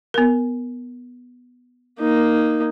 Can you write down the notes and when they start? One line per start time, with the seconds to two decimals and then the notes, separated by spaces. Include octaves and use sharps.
0.14 B3 A#4
2.00 A#3 D#4